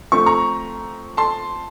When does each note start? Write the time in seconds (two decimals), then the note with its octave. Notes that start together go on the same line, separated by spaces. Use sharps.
0.12 F3 A3 C4 C#6
0.26 A#5 C#6
1.17 A5 C6